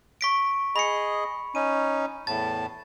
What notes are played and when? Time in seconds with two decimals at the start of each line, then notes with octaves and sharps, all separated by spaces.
0.21 C#6 B6 D7
0.76 G#4 D#5 B5 C#7
1.55 C#4 D#4 D#7
2.27 E2 A2 A5 A6